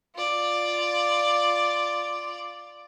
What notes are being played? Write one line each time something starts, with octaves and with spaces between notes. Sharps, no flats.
F4 D5